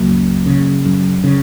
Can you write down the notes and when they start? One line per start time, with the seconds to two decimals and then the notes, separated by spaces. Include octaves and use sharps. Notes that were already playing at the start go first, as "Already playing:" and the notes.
Already playing: C#2 F#3 A#3
0.08 F#2
0.46 C#3
0.85 F#2
1.24 C#3